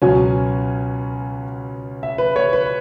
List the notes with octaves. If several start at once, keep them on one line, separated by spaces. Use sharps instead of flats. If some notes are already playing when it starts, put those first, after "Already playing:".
C#2 B2 F#3 C#4 G#5
E5
B4
C#5
B4